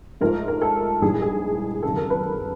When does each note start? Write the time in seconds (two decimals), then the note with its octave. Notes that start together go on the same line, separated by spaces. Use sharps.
0.21 G#2 F3 A3 A#4
0.48 A#4
0.62 A4
1.02 A#1 G#2 E3 G3 G#4
1.22 G#4
1.83 G#1 F#2 C#3 A4
1.96 A#4
2.10 B4